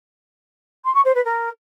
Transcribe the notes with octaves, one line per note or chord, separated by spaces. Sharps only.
C6
C#6
C5
B4
A#4